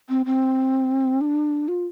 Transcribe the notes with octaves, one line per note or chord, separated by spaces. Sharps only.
C4
C4
D4
F4